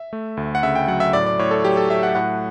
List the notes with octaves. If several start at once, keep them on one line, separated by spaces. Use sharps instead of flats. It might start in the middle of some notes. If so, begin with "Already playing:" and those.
Already playing: E5
A3
D2
F#5
C#3 E5
G5
F#3 F#5
E5
A2 D5
D5
A2 C#5
A4
F#3 G4
A4
A3 E5
F#5
A2 F#5